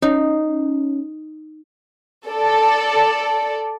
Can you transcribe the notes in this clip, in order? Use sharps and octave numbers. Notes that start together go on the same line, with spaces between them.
C#4 D#4
A4 D5